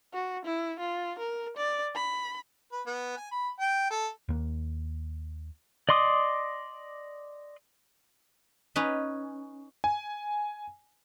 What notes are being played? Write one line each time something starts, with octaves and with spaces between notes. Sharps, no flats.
F#4
E4
F4
A#4
D5
B5
B4
B3
G#5
B5
G5
A4
D#2 A#3
D5 D#5 C6 D6 D#6
C#4 D#4 B4
G#5